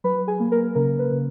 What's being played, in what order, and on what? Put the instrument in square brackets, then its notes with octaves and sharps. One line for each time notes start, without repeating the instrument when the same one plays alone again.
[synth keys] F#3 B4 B5
G#4 G#5
A#3
A#4
C#3 A#4
B4
C#3